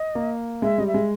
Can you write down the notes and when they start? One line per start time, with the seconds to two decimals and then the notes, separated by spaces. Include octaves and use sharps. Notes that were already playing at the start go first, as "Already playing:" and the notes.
Already playing: D#5
0.15 A#3
0.62 G#3 E5
0.78 G3 D#5
0.87 E5
0.94 G#3